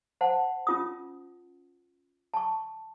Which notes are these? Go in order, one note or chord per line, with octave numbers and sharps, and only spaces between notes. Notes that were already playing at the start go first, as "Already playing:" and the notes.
C5 F#5 A5
C#4 F4 D#6
A5 C#6